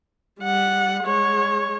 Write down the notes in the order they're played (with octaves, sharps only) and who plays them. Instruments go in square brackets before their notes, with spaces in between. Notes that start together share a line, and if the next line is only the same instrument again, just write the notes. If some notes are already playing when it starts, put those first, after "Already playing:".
[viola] G3 F#5
G#3 C#5